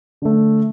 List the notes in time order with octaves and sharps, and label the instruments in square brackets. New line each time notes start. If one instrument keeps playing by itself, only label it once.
[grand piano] D3 A3